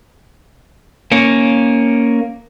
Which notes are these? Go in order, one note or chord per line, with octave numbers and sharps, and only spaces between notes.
A#3 C#4